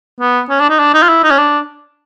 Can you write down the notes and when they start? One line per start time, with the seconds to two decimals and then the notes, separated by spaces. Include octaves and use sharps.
0.20 B3
0.50 C#4
0.60 D4
0.70 D#4
0.79 D4
0.94 D#4
1.03 F4
1.09 E4
1.24 D#4
1.31 C#4
1.38 D4